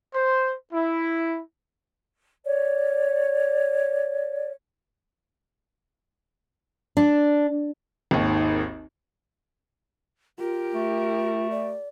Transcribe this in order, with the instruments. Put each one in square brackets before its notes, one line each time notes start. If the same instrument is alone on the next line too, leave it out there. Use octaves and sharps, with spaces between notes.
[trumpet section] C5
E4
[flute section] C#5 D5
[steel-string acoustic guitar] D4
[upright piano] G#1 D#2
[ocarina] F4 [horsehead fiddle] G4 A#4
[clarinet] A3
[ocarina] D5